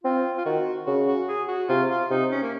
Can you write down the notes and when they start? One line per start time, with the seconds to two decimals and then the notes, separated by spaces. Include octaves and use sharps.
0.04 C4 F4
0.38 F4
0.46 D#3 F#4
0.86 C#3 F#4
1.07 F#4
1.29 G#4
1.48 F#4
1.69 C3 F4
1.90 F4
2.11 C3 D#4
2.31 C#4
2.43 A#3